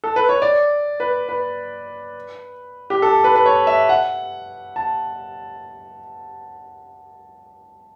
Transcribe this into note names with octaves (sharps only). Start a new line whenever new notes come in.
A4
B4
C#5
D5
B4
B4
G4
A4
B4
B4
C#5
E5
F#5
A5